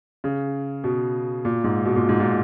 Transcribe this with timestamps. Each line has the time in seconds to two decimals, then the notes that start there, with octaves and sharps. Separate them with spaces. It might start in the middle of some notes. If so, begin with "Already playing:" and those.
0.24 C#3
0.84 B2
1.45 A#2
1.64 G#2
1.85 B2
1.96 A#2
2.09 G#2
2.20 A#2